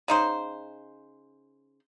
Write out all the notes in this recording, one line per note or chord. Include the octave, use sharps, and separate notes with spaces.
C#3 D#4 C5